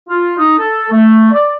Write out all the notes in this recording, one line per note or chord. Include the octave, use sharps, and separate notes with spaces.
F4
D#4
A4
A3
D5